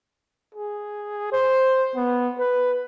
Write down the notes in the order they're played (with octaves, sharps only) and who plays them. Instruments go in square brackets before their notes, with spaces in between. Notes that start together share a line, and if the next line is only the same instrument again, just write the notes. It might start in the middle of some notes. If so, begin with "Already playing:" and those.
[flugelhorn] G#4
C5
B3
B4